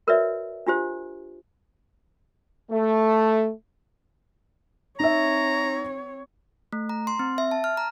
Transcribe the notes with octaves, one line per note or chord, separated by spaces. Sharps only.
F#4 A#4 B4 C#5 D5 E5
D4 F4 G4 C5
A3
C4 D#4 C#5 E5 A#5
A3
A#5
C6
C4
E5
A5
F6
A#5